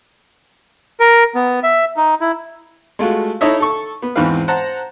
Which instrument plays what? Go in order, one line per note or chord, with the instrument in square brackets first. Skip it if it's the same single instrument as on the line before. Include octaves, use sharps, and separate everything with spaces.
[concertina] A#4
B3
E5
D#4
E4
[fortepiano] G#3 A3 F4 F#4
D#4 E4 A4 C#5 D#5 E5
A4 C#6
B3
E2 G#2 E3 C4 B4 F5
C5 F#5 A5 A#5